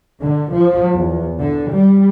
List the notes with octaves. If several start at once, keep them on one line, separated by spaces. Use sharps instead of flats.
D3
F3
E2
D3
G3